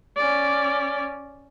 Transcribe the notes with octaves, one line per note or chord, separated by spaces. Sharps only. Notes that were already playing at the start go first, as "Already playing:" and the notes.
C#4 D5